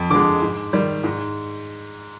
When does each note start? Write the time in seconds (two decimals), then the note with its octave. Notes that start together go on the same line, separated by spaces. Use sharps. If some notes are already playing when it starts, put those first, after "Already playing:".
Already playing: F2
0.10 D3 G#3 D6
0.42 G#2
0.73 D#3 G3
1.04 G#2